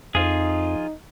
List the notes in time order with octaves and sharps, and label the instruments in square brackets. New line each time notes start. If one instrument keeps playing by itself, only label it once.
[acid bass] F2 [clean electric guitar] F3 F4 G#4 [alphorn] D#4